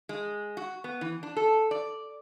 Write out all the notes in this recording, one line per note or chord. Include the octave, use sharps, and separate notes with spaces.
G#3
F#4
B3
E3
D4
A4
D5